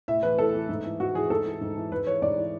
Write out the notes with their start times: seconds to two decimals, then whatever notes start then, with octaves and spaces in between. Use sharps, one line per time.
0.08 A2 E5
0.23 E3 B4
0.38 A2 A4
0.54 E3
0.69 G#2
0.84 E3
1.00 G#2 F#4
1.15 E3 G#4
1.30 G#2 A4
1.45 E3
1.61 G#2
1.77 E3
1.92 G#2 B4
2.07 E3 C#5
2.22 G#2 D5
2.37 E3